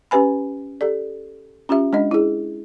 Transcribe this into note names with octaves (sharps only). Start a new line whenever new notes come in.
C#4 G4 B4 G#5 B5
G4 A4 D5
C#4 F4 G4 E5
G#3 D4 D#5
E4 G#4